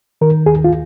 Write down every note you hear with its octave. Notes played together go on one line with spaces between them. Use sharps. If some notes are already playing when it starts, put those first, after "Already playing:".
D#3 A#4
D#2 G#4
F4